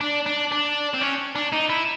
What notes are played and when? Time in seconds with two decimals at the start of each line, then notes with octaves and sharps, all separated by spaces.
0.01 D4
0.26 D4
0.52 D4
0.94 C4
1.01 C#4
1.35 D4
1.52 D#4
1.69 E4